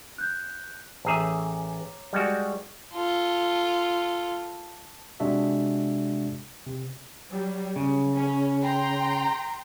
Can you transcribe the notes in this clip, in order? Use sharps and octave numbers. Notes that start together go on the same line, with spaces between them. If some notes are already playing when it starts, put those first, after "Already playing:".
F#6 G6
A1 G#4 C#5 E5 A#5 D6
G3 G#3 F#4
F4 A4
C3 G#3 D4 F#4 E5
C3
F#3 G3
C#3
C#4
G5 A#5 C6